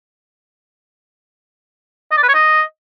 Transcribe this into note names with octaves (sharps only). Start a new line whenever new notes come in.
D#5
D5
B4
C#5
D#5